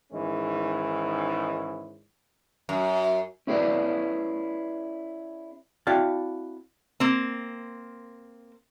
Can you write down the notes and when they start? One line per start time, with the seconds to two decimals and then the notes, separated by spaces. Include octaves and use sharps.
0.12 G#2 D#3 E3 G#3 C#4
2.69 F#2
3.47 C#4 E4 G#4 B4 D5
5.87 C4 E4 F#4 D5 F5 A5
7.00 A#3 C4